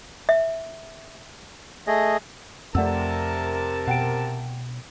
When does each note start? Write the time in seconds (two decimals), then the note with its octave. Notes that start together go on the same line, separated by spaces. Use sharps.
0.29 E5
1.87 A3 G#4 D#5
2.75 F2 C3 A3 A#4 D5 F#5 A5 E6
3.87 B2 F#5 G5 D7